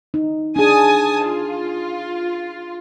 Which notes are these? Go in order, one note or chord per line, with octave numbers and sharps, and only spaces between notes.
D#4
D4 G#4 G#5 A5 D#6
F4